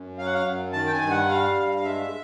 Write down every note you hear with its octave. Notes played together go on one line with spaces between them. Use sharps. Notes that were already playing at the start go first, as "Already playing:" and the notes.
Already playing: F#2
F#3 F5
F#5
F5
F#2
D#3 A5
G5
G#5
G2
F#5
G3 F5
G2
G#3 E5